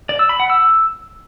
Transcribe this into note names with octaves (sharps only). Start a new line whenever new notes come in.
D5
E6
B5
F#5
E6